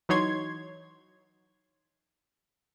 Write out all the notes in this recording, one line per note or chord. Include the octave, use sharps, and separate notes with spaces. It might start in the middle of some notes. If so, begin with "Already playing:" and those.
E3 F#3 D#4 C#5 C6 G#6